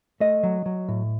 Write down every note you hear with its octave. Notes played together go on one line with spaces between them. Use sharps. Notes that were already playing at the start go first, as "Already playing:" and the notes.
A3 D#5
F#3
F#3
A2